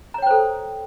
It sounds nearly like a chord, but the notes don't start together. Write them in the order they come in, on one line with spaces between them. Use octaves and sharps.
A#5 C#5 G5 C5 A4